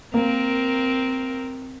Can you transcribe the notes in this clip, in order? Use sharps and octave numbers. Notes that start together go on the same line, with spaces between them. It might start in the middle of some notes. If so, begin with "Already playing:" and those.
A#3 C4 A#4